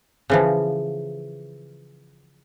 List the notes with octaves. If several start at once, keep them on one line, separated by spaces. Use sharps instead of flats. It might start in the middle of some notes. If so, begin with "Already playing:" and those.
C#3 E3 F3